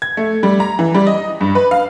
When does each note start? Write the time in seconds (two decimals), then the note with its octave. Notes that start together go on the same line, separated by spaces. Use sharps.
0.02 G#6
0.17 A3
0.43 G3
0.60 A#5
0.79 E3
0.94 G3
1.07 D#5
1.41 G2
1.55 B4
1.71 F5